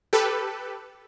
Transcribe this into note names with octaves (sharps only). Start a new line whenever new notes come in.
G4 A4 B4